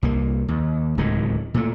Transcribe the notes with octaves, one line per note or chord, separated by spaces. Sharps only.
C2 A#3
D#2
D1 C#2 A2 D#3
A#2 A3